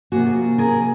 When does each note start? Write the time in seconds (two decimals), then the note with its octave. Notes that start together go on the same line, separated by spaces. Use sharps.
0.12 C3 F3 A#3 F#4 G#4
0.58 G#4 A#4